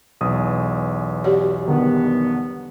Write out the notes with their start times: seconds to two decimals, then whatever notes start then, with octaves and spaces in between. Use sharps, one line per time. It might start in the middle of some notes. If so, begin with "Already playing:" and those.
0.21 B1 E2 D#6
1.24 F#4 G4 C#5 D5
1.67 D3 D#3 G3 B3